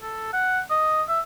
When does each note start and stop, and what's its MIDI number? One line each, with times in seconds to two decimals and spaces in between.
0.02 0.29 69
0.33 0.61 78
0.70 1.03 75
1.08 1.20 76